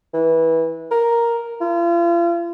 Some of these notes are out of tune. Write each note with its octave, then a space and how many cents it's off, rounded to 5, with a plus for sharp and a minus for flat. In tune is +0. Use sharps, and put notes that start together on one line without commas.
E3 -20
A#4 +5
F4 -40